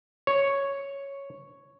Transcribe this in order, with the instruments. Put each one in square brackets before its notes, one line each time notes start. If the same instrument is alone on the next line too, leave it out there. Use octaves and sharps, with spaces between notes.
[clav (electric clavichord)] C#5